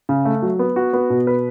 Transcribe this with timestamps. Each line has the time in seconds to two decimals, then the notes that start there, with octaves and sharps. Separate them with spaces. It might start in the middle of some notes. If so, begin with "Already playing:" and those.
0.09 C#3
0.25 A3
0.42 F#3
0.59 B3
0.76 F#4
0.93 B3
1.10 B2
1.27 B4